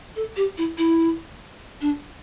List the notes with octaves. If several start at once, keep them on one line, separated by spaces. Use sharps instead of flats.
A4
G4
E4
E4
D4